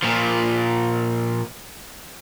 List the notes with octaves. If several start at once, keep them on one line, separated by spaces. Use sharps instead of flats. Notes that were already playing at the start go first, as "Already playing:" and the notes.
A#2 F3